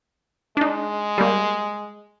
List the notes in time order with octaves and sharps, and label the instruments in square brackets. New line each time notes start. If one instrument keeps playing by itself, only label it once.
[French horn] G#3 [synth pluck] D4 D#4
[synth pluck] G3 A#3